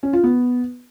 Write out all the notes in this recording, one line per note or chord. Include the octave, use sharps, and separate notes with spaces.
C#4
F4
B3